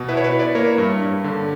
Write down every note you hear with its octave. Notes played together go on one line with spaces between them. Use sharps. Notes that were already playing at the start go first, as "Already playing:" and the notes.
Already playing: B2
E4 B4
C#5
B4
E4
B4 D5
A#3 A#4 C#5
G2
G2
D3